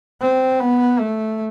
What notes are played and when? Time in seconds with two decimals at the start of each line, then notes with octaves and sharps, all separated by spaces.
0.21 C4
0.60 B3
1.00 A3